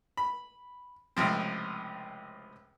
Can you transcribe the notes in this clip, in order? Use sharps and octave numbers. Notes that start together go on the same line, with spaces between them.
B5
C#2 A2 C3 F3 C4